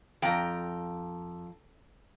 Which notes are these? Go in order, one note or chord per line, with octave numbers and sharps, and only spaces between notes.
F2 G5 A#5